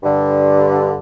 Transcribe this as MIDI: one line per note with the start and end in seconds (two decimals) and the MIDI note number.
0.03 0.99 43
0.03 0.99 50